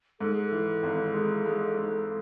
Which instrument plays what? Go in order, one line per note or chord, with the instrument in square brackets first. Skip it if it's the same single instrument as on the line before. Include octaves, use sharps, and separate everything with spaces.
[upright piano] G#2 [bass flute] A4
[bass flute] G#4
A4
[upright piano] E3
G#1
G#3
G#3
G#2